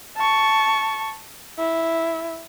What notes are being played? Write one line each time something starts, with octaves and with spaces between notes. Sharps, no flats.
A5 C#6
E4